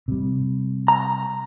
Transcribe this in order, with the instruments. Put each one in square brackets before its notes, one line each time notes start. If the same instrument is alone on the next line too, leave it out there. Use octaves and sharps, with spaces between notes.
[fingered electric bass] C3 G3
[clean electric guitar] A#5